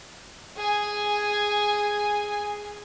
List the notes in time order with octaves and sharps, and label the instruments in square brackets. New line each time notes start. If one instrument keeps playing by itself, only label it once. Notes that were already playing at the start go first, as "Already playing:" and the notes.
[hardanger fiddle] G#4 G#5